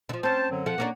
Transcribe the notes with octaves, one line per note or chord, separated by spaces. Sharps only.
D3 F3
C4 C#4 C5 A5
F#2 D3 F#3
F3 A4 F#5
A#3 C#4 D4